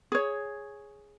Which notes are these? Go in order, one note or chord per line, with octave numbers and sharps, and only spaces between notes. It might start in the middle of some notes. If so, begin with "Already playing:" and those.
G#4 C#5